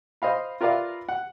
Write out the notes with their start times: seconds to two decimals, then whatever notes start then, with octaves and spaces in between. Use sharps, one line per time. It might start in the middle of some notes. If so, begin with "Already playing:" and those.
0.22 C5 D#5 F5 B5
0.61 F4 A#4 B4 D5 E5 F5
1.09 F#5